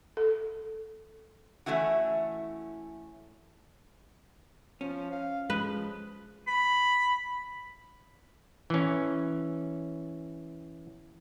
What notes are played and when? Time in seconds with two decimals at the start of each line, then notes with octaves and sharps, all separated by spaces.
0.17 A4
1.66 E3 A3 C#4 E4 F#4
4.81 F3 C#4
5.11 F5
5.50 F3 G#3 B4
6.47 B5
8.70 E3 C#4